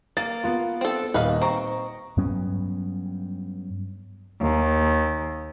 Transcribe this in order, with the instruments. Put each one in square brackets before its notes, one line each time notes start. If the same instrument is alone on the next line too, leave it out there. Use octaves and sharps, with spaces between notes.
[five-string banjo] A#3 [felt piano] A6
[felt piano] B3 F4
[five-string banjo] C4 A4
[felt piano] D#1 D#5 [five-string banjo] B4 F5
[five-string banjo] C4 [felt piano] A#5 C#6
[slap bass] G2 F#3 B3 C#4
[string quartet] D#2